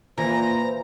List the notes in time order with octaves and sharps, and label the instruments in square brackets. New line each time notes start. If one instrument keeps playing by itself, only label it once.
[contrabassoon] A#2 [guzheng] E3 [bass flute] C5 [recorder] A#5